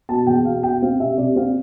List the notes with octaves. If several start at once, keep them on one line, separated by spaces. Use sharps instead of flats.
B2 A5
E2 G5
B2 F5
B2 G5
C4 F5
C3 E5
C3 D5
C4 F5